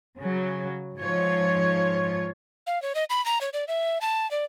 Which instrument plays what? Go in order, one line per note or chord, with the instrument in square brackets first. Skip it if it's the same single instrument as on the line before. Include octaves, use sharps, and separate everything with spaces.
[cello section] C#3 F#3
G#2 F3 F4 C#5
[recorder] F5
C#5
D#5
B5
A#5
C#5
D5
E5
A5
D5